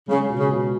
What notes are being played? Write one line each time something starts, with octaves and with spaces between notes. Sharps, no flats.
C#3 G#3
B2
C#3
B2